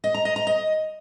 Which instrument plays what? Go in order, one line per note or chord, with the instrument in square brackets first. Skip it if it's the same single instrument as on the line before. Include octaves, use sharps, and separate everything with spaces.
[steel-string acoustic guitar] D#5
A#5
D#5
A#5
D#5